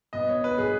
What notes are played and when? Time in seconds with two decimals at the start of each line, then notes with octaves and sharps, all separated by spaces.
0.13 B2 B3 D#5
0.29 C#5
0.44 B4
0.58 B2 B3 G#4